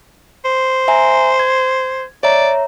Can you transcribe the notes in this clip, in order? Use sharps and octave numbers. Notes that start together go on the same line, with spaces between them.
C5
E5 G#5 A#5
G#6
C#5 D5 E5 A#5